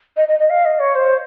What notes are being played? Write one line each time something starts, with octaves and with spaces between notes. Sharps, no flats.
D#5
D#5
D#5
F5
D#5
C#5
C5